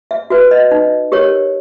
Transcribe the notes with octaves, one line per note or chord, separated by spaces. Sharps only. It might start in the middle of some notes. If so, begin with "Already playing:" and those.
E5
F#4 B4 E5
D#5
D#4
G4 A#4 C#5